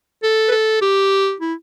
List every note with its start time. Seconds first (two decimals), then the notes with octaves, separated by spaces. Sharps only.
0.23 A4
0.49 B4
0.51 A4
0.82 G4
1.40 E4